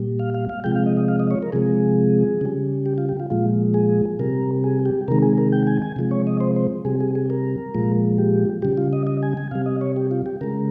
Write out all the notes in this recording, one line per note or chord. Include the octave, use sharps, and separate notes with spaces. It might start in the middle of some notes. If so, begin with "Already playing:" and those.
Already playing: A#2 G3
F5
F5
F5
C3 F3 G#3 G5
F5
D#5
D#5
F5
D#5
C#5
A#4
C3 F3 G#3 G#4
C#3 G3
G4
F4
G4
F4
A#2 F3 G#3 F4
G#4
C3 G3 A#4
G#4
G4
C3 D#3 G#3 A#4
G#4
A#4
G5
G#5
G#5
C3 F3 G#3
C#5
D#5
C5
C5
C3 G3 G#4
G#4
G#4
A#4
A#2 F3 G#3
G4
C#3 G3 G4
F4
D#5
D#5
G#5
G#5
C3 G3 F5
D#5
C#5
G4
F4
G4
C#3 G#3 A#4